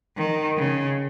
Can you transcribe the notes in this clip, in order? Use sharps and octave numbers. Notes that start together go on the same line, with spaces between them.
D#3
C#3